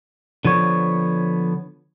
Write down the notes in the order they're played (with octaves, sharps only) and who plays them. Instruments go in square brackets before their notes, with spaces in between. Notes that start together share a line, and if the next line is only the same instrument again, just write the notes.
[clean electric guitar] D3 F3 B3 C#5